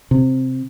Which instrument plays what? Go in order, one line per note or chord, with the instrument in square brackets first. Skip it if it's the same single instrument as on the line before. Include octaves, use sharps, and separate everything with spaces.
[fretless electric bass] C3